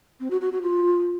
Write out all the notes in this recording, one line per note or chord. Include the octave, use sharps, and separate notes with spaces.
C4
F#4
F#4
F#4
F4